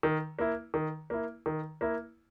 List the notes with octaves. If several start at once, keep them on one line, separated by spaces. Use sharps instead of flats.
D#3
A#3 E4
D#3
A#3 E4
D#3
A#3 E4